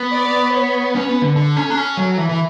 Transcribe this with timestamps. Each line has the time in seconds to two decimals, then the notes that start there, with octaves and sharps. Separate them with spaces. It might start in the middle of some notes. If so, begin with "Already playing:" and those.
Already playing: B3
0.13 D5
0.54 C#5
0.95 C#4 B4
1.09 B3
1.22 D3
1.36 D3 A4
1.57 C#4
1.70 D4
1.77 C#4
1.97 F#3
2.18 E3
2.29 E3